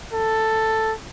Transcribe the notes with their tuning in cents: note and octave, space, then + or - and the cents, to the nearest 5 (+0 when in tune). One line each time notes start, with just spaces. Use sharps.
A4 +5